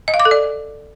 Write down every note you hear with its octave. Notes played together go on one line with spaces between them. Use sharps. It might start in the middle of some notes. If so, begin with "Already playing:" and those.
D#5
F5
D6
A4
D5